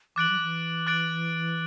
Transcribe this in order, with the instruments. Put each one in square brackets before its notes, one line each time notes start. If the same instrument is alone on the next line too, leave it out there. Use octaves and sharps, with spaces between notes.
[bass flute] E3 [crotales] D6 F#6 A6 D7 F#7
[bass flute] F#3
E3
[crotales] D6 F#6 A6 D7 F#7